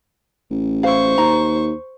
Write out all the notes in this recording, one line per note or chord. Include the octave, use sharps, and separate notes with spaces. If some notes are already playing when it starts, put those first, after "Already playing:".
A1
E4 C5 F5 C#6
D#2 A#5